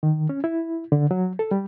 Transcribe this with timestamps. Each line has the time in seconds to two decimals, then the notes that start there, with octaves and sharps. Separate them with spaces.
0.03 D#3
0.29 C#4
0.44 E4
0.92 D3
1.11 F#3
1.39 A4
1.51 G3